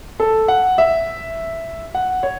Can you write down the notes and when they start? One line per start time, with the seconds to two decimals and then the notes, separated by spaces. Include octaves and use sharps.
0.20 A4
0.48 F#5
0.78 E5
1.95 F#5
2.23 C#5